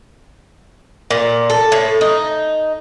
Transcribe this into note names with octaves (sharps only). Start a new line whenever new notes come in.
A#2
A4
A2
D#4